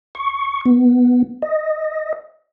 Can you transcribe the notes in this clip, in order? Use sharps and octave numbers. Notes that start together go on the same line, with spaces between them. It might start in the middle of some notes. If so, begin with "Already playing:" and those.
C#6
B3
D#5